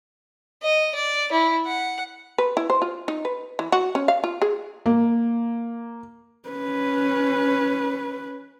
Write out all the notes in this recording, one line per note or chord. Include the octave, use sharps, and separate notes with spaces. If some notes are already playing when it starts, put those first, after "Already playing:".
D#5
D5
E4
F#5
B4
E4
C5
F4
D#4
B4
E3
F#4
C#4
F5
F4
G#4
A#3
C#4 B4